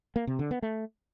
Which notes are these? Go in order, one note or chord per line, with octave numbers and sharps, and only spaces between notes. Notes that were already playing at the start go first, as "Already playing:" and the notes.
A#3
C3
D3
B3
A3